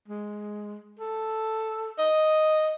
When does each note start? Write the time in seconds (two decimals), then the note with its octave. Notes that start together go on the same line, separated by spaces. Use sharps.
0.08 G#3
1.00 A4
1.98 D#5